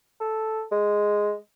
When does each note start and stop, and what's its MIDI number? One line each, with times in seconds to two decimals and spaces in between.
0.20 0.62 69
0.71 1.34 56